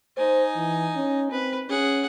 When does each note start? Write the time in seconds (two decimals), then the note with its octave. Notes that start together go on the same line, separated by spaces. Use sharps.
0.17 D#4 C5 G#5
0.56 E3
0.96 C#4
1.31 C4 B4
1.69 C#4 G#4 F#5